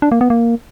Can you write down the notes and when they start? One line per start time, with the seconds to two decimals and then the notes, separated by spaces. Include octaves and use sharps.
0.02 D4
0.12 A#3
0.21 B3
0.30 A#3